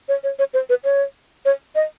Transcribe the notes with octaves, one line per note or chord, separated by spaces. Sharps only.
C#5
C#5
C#5
C5
B4
C#5
C#5
D#5